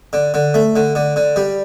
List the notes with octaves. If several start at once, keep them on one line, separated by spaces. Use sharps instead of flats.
D3
D3
A3
D3
D3
D3
G3